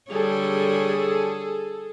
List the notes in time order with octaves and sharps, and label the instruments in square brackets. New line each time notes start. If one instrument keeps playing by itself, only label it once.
[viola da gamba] D3 G3 C#5 [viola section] G#4 A4